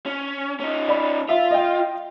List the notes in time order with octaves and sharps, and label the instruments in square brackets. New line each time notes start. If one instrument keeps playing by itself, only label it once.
[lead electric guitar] C#4
C#4 D#4
[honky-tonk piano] D5 B5
[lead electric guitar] F4 [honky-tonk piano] E5
[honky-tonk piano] D#5 G5